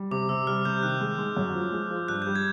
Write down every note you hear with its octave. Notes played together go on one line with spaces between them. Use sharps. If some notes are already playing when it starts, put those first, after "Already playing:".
Already playing: G3
C3 D6
C3 E6
G3 F6
C3 G6
D#3 F#6
G#3
G#3
F#2
F3
G#3
F3
G2 F#6
G6
G3
G#6